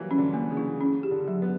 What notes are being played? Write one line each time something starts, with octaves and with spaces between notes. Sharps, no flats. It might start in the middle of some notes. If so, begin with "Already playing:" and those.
Already playing: E3 F#3 G3 A#3
C#4
D3
A#3
C#3
E4
C#3 C#4
G4
D3
F#3
B3